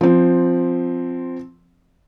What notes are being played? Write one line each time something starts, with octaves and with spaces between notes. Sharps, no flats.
F3 C4